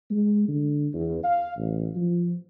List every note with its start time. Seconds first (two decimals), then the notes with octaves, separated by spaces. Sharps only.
0.11 G#3
0.49 D3
0.94 E2
1.24 F5
1.58 A1
1.96 F3